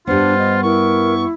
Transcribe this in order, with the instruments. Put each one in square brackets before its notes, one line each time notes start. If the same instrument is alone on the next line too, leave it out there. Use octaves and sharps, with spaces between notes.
[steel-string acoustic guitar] G2 B3 [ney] D4 [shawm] F4 [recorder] C5
[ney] D#5
[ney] E4 [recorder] A#4 [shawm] C#6